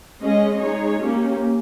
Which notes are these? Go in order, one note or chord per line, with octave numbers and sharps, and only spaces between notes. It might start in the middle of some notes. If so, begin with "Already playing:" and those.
G#3 C#4 G#4 D#5
G#3 D#4 G#4 C#5
A#3 C#4 G4